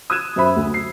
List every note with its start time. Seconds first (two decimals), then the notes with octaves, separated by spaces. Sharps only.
0.10 D#6 E6 F#6 G#6 D#7 E7
0.36 F#2 C5 E5 B5
0.57 D2
0.74 C7